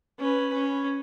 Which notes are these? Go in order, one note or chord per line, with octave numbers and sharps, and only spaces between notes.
C#4 B4
C#4